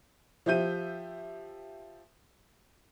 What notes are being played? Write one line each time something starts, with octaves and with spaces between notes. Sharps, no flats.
F3 G4 E5 G6 D#7